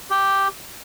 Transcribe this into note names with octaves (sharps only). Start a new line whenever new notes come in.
G4